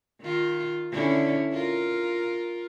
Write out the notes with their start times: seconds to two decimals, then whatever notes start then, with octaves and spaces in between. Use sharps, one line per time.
0.21 D#3 F4
0.91 D3 C#4 E4
1.53 F4 A#4